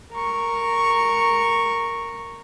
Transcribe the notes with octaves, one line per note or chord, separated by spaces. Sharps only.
A#4 C#6